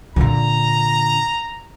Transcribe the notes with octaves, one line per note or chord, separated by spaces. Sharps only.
A#2 D3 A#5